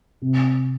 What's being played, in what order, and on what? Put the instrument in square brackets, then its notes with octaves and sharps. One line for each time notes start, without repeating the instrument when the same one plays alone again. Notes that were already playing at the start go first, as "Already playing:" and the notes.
[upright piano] C3